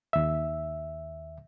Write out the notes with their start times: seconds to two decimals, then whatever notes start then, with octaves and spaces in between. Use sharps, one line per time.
0.13 D#2 E5